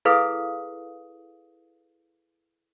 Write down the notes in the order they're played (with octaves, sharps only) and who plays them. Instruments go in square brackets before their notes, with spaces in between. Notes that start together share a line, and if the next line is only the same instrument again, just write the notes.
[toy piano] E4 G#4 A4 B4 F5 D#6